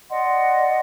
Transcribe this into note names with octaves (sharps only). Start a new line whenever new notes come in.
D5 D#5 F#5 C6